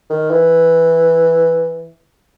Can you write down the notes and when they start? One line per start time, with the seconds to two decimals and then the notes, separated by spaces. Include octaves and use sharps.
0.10 D#3
0.31 E3